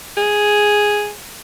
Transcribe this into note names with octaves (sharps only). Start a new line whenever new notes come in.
G#4